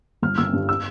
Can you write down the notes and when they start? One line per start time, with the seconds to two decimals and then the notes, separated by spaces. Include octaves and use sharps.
0.22 G1 F6
0.38 G1 E6
0.53 G2
0.69 E6